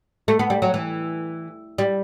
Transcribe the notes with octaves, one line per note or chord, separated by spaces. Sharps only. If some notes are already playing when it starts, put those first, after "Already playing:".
A3
B3
G3
F#3
E3
G3